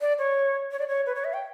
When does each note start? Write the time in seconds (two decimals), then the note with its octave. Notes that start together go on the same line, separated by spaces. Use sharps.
0.01 D5
0.19 C#5
0.71 C#5
0.79 D5
0.88 C#5
1.06 B4
1.15 C#5
1.25 E5
1.33 G5